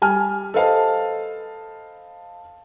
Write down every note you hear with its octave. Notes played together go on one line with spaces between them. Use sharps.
G3 G#5 F6
A4 B4 C5 D#5 F5 A5